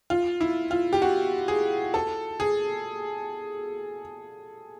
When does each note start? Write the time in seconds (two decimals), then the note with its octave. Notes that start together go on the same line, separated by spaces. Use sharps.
0.10 F4
0.41 E4
0.71 F4
0.93 G4
1.02 F#4
1.48 G#4
1.94 A4
2.40 G#4